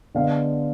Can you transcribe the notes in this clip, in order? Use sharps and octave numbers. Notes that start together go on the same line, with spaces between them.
D3 G#3 B3 F5